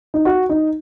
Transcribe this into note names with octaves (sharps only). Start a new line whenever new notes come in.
D#4
F#4
D#4